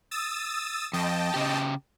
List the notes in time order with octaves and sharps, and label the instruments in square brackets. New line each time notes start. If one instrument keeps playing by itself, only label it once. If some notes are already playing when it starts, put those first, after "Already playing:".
[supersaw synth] D#6 E6 A6
[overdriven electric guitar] F2 [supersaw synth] D#5 G5 A5
[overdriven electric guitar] C#3 G4